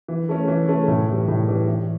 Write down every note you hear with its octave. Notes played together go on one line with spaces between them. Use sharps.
E3
A3 C#4
E3
A3 C#4
A2
E3
G3
A2
E3 G3
E3